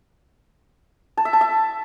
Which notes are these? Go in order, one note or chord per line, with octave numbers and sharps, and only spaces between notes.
A5
E5
A5
E5